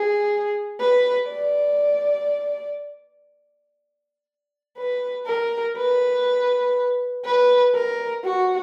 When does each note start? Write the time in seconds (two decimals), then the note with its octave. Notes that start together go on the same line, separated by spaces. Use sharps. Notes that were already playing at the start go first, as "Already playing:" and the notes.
Already playing: G#4
0.80 B4
1.29 D5
4.77 B4
5.27 A#4
5.77 B4
7.25 B4
7.75 A#4
8.24 F#4